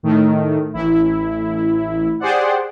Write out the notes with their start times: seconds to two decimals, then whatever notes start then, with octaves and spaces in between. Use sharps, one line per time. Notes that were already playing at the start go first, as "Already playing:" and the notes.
0.03 A2 D#3 A3
0.74 A1 E4
2.20 G4 G#4 C5 D5 F#5